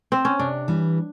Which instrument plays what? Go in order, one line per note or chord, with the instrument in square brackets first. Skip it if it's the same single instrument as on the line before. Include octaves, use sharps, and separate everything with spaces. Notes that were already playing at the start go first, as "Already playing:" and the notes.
[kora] C4
C#4
[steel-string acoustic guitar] C3 [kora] D4
[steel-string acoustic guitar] E3 G3